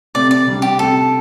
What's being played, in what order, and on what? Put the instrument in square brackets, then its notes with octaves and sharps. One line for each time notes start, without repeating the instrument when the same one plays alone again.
[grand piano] C3 A3 C4 [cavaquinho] D5
[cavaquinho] D5
[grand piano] C3 G3 D4
[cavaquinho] G4
[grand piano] C3 A3 C4 [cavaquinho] A4